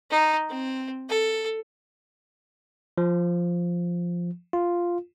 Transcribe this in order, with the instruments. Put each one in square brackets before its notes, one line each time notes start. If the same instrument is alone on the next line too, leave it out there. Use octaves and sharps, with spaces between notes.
[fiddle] D#4
C4
A4
[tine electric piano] F3
F4